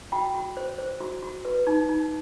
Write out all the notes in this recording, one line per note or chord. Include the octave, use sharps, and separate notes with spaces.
F#4 G5 B5
F#4
C5
C5
F#4
F#4
B4
D#4
D#4